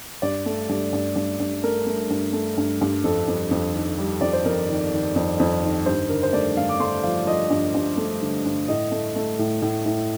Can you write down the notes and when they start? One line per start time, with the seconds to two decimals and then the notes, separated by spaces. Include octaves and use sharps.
0.22 G2 D5
0.46 A3
0.69 G2
0.93 G2
1.16 G2
1.40 G2
1.63 A3 A#4
1.87 A3
2.10 G2
2.33 A3
2.58 G2
2.81 G2
3.04 F2 A4
3.28 F2
3.51 F2
3.74 D#3
3.98 G3
4.21 F2 D5
4.33 C5
4.45 F2 A#4
4.69 D#3
4.93 D#3
5.16 F2
5.40 F2
5.63 D#3
5.86 G2 C5
6.09 D3 A#4
6.23 C5
6.33 A3 D5
6.57 G2 F5
6.69 D6
6.80 A3 C6
7.03 F3 F5
7.27 F3 D#5
7.50 G2
7.75 G2
7.97 A3
8.22 D3
8.45 G2
8.68 A2 D#5
8.91 A3
9.16 A3
9.39 A2
9.62 A2
9.86 A2